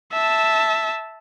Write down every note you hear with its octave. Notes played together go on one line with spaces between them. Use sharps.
E5 A5